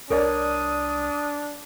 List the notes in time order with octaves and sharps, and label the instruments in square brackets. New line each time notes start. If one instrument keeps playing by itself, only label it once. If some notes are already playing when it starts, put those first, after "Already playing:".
[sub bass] C2 [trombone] D4 [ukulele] A#4 C#5 D5 [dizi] D#6